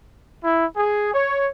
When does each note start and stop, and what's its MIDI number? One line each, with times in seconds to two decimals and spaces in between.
0.43 0.65 64
0.76 1.09 68
1.12 1.48 73